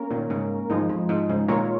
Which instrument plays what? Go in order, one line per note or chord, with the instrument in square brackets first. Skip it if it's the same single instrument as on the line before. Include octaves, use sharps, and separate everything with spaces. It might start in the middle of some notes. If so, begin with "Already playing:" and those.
Already playing: [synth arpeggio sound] A#3 C#4 A#4
[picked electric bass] A#2 D#3
G#2 C#3
[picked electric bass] G#2 [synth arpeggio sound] F3 G#3 D#4
[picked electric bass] F2
G#2
G#2 C#3
[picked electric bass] A#2 D#3 [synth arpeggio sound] G#3 F4 A#4 C#5